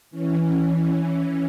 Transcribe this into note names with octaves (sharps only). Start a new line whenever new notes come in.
E3 C#4